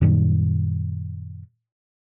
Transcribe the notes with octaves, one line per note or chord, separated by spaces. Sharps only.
F#2 A#2 D#3 G3